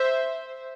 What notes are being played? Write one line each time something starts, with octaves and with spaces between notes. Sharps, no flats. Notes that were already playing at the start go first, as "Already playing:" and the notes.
Already playing: C5 E5